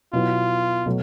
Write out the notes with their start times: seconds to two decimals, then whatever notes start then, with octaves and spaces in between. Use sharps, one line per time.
0.13 B2 F#3 B3 E4 F4
0.86 B2 F#3 A3